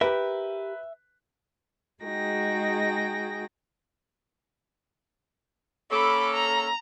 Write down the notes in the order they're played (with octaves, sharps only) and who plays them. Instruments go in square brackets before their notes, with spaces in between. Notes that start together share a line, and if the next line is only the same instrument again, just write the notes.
[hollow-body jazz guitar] G4 A#4 [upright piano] B4 [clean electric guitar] E5
[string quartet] G#3 D#4 F#4 G#4 G5 A#6
[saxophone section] A#3 C#4 A4 [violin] B5 D6
[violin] A#5